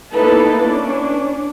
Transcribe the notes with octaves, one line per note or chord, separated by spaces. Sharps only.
A#3 B3 D#4 E4 A4 B4
C#4 D4